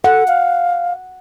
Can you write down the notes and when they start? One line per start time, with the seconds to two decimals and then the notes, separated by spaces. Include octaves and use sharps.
0.04 A4 F#5
0.28 F5